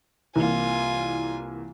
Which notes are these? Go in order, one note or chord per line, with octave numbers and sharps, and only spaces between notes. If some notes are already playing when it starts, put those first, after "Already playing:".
C2 E3 A#3 F4 G#5